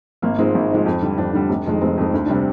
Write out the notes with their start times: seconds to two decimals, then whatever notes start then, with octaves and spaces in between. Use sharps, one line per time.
0.22 G#1 A#3
0.38 G#2 F3 G#3 C4
0.55 G#1
0.70 G#2 F3 G#3
0.86 F2
1.02 D3 G3
1.18 F2 D4
1.33 D3 G3
1.50 F1
1.66 F2 D#3 G#3
1.81 F1 C4
1.98 F2 D#3 G#3
2.14 D2
2.26 C3 G3 D4
2.35 C4